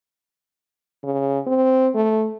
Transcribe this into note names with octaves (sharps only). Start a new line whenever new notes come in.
C#3
C4
A3